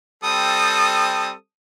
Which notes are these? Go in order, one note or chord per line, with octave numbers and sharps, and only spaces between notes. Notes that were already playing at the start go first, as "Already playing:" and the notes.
G3 C4 A4 D#6